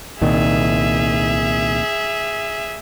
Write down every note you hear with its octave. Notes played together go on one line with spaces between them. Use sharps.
C2 A#2 D#3 G#4 E5